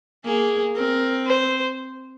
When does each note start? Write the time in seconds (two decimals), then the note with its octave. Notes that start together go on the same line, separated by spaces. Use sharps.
0.25 A#3 G#4
0.76 C4 A#4
1.26 C5